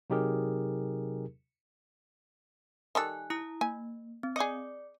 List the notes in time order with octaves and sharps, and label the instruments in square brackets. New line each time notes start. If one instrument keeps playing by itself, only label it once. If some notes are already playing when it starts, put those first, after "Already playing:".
[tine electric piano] C3 F#3 D#4 G4 G#4 A#4
[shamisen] D#3 G3 A4 [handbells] G#5 F#6
[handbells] E4 A#5 D#6
[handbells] A#3 [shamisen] G#5
[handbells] C4
[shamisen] G#4 D#5 [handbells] D5 D6 C#7